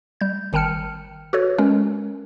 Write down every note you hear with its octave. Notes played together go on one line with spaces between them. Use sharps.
G3 G6
G#1 D#3 G5 A5 F6 C#7
F#4 A4 B4 C#5
G#3 C#4 A#4